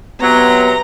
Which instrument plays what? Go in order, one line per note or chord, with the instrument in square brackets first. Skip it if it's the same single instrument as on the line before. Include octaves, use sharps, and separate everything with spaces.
[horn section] C3 F#3 [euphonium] B3 [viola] A#5